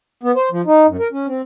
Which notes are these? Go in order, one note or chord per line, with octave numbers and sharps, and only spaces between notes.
B3
C5
F3
D#4
F#2
A#4
C#4
C4